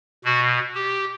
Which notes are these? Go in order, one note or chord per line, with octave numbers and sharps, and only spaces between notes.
B2 F#4
G4